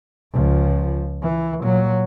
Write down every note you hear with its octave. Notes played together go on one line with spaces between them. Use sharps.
C#2 F3
E3
A#2 F#3